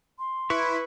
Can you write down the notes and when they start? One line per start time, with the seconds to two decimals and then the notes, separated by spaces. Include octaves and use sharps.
0.19 C6
0.50 E4 B4 C#6